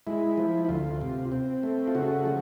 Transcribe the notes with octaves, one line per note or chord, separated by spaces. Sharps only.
G#3 E4
F3
E4
D2 F4
C3
C4
A3
F4
C#3 F#4
F3